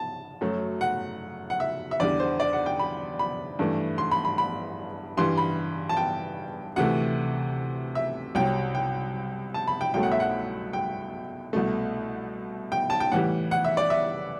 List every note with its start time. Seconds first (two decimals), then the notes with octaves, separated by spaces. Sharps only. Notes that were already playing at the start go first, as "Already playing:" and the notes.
Already playing: A5
0.41 F#2 F#3 A3
0.81 F#5
1.50 F#5
1.60 E5
1.91 E5
2.00 E2 D3 G3 D5
2.20 C5
2.40 D5
2.53 F#5
2.66 G5
2.79 B5
3.19 B5
3.59 G2 E3 A3
3.98 C6
4.11 B5
4.25 B5
4.38 B5
5.17 G2 E3 G3 C6
5.38 B5
5.89 A5
5.97 G5
6.76 D2 C3 E3 A3 F#5
7.95 E5
8.35 C2 C3 F#3 G5
8.75 G5
9.54 A5
9.68 B5
9.81 G5
9.94 C2 B2 F#3 A3 G5
10.03 F#5
10.12 E5
10.20 F#5
10.73 G5
11.53 C2 B2 A3
12.72 G5
12.90 A5
13.00 G5
13.12 A2 E3 G3 F#5
13.51 F#5
13.65 E5
13.77 D5
13.90 E5